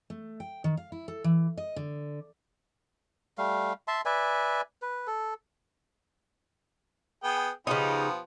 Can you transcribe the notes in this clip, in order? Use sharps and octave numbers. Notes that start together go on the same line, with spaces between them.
A3
G5
D#3
F5
E4
A4
E3
D#5
D3
G3 A3 F5
E5 A5 C6
B4 D5 E5 G#5
B4
A4
B3 G#4 G5
C#3 F3 B3 D#4 G4